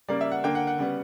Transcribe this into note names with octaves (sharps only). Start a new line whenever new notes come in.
C#3 G3 A#3 D5
E5
F#5
D3 A#3 G5
F#5
F#5
C#3 G3 B3